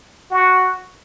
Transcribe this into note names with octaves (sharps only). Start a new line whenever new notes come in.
F#4